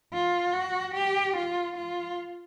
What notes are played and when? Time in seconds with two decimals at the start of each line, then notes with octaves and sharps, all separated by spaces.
0.13 F4
0.54 F#4
0.95 G4
1.37 F4
1.77 F4